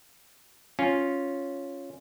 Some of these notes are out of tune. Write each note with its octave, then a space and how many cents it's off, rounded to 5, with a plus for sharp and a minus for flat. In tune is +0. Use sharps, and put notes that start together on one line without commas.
C#4 +0 F4 +0